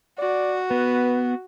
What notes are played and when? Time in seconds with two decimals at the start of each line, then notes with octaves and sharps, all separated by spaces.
0.19 F#4 D5
0.71 B3 B4